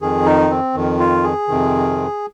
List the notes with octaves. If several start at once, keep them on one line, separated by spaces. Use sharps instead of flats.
F2 D#3 G#4
D#4
C4
F2 D#3
F4
G#4
F2 C3 D#3